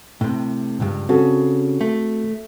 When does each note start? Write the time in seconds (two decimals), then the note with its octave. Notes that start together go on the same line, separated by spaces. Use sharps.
0.21 A2 C3
0.80 C#2 G2
1.09 C#3 C4 F#4 A4
1.81 A3